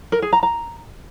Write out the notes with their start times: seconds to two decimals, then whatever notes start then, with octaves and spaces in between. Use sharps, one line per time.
0.12 A#4
0.22 G#4
0.33 A#5
0.43 A#5